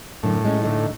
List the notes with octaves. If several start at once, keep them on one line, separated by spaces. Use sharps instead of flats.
F#2 A2 D3
G#3 C#4
D3 A3 D#4